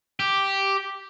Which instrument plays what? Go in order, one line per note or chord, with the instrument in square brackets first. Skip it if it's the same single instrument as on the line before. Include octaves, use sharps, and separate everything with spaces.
[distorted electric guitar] G4